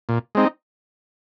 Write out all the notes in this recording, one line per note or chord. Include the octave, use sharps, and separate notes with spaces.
A#2
G#3 C4 D#4